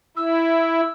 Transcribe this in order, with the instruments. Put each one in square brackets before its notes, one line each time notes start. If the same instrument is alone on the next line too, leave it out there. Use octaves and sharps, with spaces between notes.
[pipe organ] E4 [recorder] E6